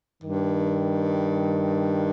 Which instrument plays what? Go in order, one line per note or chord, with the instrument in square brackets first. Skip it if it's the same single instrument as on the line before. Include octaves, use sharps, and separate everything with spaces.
[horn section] G2 D#3